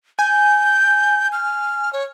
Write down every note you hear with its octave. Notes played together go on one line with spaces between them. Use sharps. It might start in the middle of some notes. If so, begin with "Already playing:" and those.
G#5 G6
F6
C#5